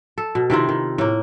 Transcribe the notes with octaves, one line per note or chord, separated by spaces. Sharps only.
A4
B2
C3 D#3 E4 F4
D#3
A2 A#3